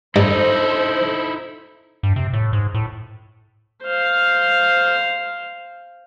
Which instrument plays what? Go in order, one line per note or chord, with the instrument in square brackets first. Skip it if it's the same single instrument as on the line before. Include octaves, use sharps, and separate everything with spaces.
[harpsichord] G2 [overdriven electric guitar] D#4 E4 [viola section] A4 C5
[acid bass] G2
C3
A2
G#2
A2
[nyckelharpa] C5 F5